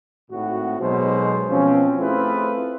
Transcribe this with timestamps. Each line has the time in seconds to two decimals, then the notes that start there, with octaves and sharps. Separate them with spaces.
0.31 G#1 A2 F#4
0.80 B1 B2 F#3 G#3 C5
1.50 B2 F3 C4 C#4
1.98 A3 C4 E4 F4 G#4 B4